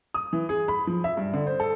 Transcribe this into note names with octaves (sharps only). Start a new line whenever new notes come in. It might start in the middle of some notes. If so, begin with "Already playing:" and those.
D#6
E3
G#4
B5
F3
E5
G2
D3
C5
A4